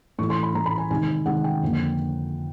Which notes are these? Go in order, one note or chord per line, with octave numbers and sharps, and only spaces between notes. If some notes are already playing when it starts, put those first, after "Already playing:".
A2 E3 A3 C#6
C6
B5
A2 E3 A3 A#5
B5
G#5
C3 D#3 G#3 G#5
C3 D#3 G#3 F#5
G5
F2 D3 F3 A#3